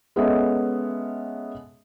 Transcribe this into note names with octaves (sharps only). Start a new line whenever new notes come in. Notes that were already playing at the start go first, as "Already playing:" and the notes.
G#3 B3 C#4 A4 D#5 E5